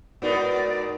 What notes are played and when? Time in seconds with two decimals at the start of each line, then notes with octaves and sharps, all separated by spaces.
0.22 G#2 B3 D#4 F#4 A#4 B4 D5